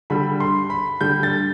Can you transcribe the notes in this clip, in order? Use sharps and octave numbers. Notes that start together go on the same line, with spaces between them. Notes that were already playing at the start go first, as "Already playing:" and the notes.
D3 G3 B5
C6
B5
D3 G3 G6
A6